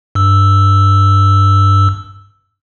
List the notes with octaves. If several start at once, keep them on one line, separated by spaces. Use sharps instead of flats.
G2 E6